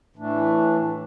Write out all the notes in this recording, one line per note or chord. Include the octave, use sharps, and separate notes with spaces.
A2 E3 A3 D4